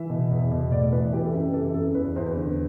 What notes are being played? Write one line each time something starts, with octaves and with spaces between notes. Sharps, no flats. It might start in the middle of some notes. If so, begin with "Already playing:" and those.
Already playing: E3 E5
B2
E2
B2
A2 D5
E3 B4
E3 G4
A4
F#2 B4
E3 A4
F#2 A4
E2 B4
E2 C5
B4
D3